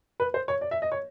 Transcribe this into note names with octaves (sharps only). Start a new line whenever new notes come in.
B4
C5
C#5
D5
E5
D#5
C#5